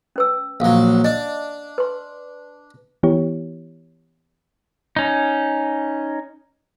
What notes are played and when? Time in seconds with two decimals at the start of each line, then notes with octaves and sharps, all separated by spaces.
0.16 C#4 B4 E6
0.60 A#1 F#3 F5
1.04 D4 D#5
1.78 B4 C6
3.03 E3 B3 E4 G4 C#5
4.96 C#4 D#4